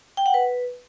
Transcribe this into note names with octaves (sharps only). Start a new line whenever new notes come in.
G5
F#5
B4